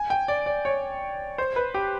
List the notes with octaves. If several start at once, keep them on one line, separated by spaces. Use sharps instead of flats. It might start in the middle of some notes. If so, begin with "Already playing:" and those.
Already playing: G#5
G5
D5
D5
C#5
C5
B4
G4